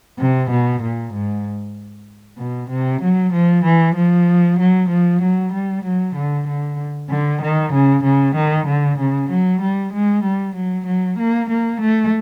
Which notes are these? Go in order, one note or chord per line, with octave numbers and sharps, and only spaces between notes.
C3
B2
A#2
G#2
B2
C3
F#3
F3
E3
F3
F#3
F3
F#3
G3
F#3
D3
D3
D3
D#3
C#3
C#3
D#3
D3
C#3
F#3
G3
G#3
G3
F#3
F#3
A#3
A#3
A3